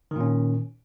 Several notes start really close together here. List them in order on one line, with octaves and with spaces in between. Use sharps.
D#3 A#2 C#4